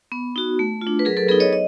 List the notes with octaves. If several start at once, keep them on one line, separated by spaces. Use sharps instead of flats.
B3
D#4 F#4
A3
F4
D4
B4
F#3 G#4 A#4
A4 B4
B3 D#4 G#4 A#4
C#5 D#5
D#5